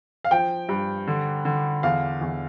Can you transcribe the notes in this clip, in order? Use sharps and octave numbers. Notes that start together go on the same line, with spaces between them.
F5
F3 G5
G2
D3
D3
E2 F5
E2